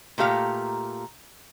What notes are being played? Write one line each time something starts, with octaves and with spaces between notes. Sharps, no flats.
A#2 A3 G4 F5 A#5